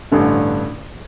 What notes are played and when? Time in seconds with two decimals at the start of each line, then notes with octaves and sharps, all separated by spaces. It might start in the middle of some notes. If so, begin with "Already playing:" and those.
0.12 A1 G2 D3